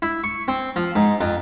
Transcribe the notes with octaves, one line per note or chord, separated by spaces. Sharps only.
E4
C#6
C4
F3
G#2
F2